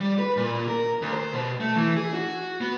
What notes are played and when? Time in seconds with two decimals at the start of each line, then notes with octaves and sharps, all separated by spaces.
0.01 G3
0.19 B4
0.37 A#2
0.68 A#4
1.02 D2
1.13 C5
1.33 B2
1.60 A3
1.76 E3
1.97 G#4
2.14 F#4
2.61 B3